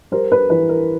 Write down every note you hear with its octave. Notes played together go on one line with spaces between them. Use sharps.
G3 A#4 C5
B4
E3 B4
A#4